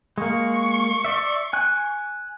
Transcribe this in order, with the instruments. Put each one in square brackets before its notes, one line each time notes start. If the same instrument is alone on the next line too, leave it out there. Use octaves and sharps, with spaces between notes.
[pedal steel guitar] G#3 A#3 [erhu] C#6
[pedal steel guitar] D5 E5
G#5 F#6